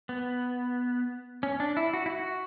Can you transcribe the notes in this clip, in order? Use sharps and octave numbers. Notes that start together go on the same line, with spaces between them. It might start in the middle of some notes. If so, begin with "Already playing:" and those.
B3
C#4
D4
E4
F#4
E4
F#4